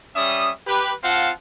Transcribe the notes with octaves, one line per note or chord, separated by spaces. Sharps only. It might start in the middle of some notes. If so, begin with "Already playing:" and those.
G3 C#4 E5 D#6
G4 B4
C4 F4 F5 F#5 A5